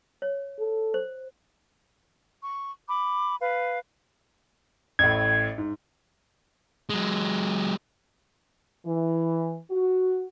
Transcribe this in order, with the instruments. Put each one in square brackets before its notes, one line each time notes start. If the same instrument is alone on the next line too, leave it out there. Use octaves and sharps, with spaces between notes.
[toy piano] C#5
[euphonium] A4
[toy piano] C5
[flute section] C#6
B5 D6
B4 F5
[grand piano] A1 A2 [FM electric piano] G#6
[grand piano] G#2
[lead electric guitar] F#3 G#3
[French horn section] E3
F#4